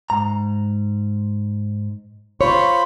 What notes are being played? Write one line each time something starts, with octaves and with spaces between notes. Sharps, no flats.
G#2 A#5
F4 C5 C#5 B5